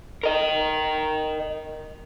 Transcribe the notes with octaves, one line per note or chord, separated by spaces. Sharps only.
A#4 D#5